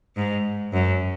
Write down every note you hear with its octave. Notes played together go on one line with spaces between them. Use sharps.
G#2
F#2